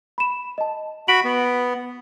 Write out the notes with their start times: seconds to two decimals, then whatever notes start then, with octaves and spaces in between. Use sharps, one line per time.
0.18 B5 E7
0.58 D#5 A5
1.08 F#4 B5 B6 D7 F#7
1.24 B3